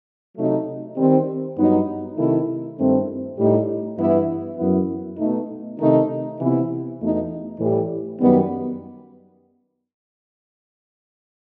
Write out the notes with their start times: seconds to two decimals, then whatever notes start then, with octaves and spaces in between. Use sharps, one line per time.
0.36 C3 F#3 A3 D#4
0.96 D#3 G3 C4
1.57 G2 F#3 B3 D#4
2.17 C3 D#3 A3 E4
2.77 G2 D#3 A3 C4 E4
3.38 A2 G3 D#4
3.97 G2 E3 B3 E4
4.57 F#2 E3 B3 E4
5.18 B2 A3 D#4
5.78 C3 D#3 A3 D#4
6.38 C3 E3 B3 E4
6.99 E2 B2 A3 D#4
7.58 A2 E3 G3
8.19 F#2 D#3 G3 B3